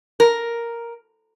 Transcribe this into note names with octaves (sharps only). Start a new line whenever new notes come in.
A#4